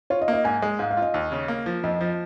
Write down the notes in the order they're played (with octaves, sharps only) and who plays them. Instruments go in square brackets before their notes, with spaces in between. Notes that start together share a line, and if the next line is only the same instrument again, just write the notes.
[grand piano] F4 [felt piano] C#5
[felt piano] D#5
[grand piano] A#3
[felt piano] D#5
[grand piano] G#2 [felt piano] G#5
[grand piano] G#3
[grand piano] G#2 [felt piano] F5
[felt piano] F5
[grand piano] F4 [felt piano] D#5
[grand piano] D#2
C#3
A#3
F3
[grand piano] F2 [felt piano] D#5
[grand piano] F3